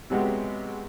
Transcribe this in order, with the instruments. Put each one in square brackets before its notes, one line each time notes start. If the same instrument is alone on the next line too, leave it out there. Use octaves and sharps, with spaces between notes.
[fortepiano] C3 F#3 G#3 B3 F#4 G4